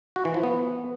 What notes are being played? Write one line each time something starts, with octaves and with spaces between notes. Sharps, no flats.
F#4
E3
F3
B3